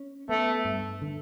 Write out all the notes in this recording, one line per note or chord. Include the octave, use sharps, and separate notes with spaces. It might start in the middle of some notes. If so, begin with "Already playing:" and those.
Already playing: C#4
A3 B3
G2
D3